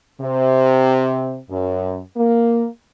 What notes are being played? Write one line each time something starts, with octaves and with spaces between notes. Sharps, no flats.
C3
F#2
A#3